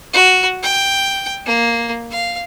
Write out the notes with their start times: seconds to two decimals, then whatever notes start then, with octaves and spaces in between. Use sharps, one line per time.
0.13 F#4
0.63 G5
1.46 A#3
2.11 F5